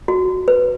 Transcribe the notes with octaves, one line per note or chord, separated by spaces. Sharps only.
F#4
B4